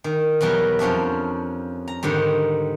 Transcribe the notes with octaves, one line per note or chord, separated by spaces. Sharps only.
D#3
E2 B2 F#3 G3 A#4
F2 F3 C#4 D4 E5
A#5
G#2 D3 D#3 G3